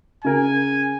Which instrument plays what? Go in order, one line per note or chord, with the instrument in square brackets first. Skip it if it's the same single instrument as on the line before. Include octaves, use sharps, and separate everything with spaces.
[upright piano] C#3 A#4 [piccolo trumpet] G#5